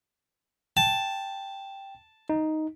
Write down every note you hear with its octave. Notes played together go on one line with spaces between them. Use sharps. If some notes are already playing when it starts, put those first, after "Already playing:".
G5 A5
D#4